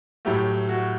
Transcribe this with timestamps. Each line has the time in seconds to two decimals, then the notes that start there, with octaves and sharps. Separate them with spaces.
0.25 A2 F#3 A3 G4
0.69 F#4